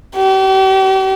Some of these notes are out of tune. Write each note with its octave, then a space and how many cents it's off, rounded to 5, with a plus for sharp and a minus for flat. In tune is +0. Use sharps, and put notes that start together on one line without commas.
G4 -40